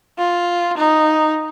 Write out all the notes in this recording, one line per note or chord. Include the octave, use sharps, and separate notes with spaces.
F4
D#4